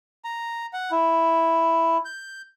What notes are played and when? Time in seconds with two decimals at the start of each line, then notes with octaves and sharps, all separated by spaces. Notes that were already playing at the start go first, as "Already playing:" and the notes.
0.24 A#5
0.73 F#5
0.91 E4
2.05 G6